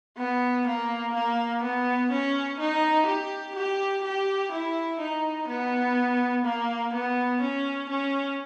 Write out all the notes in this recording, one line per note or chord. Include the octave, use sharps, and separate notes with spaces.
B3
A#3
A#3
B3
C#4
D#4
G4
G4
G4
E4
D#4
B3
A#3
B3
C#4
C#4